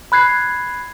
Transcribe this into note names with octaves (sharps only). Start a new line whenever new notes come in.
B5 F#6 G#6 C7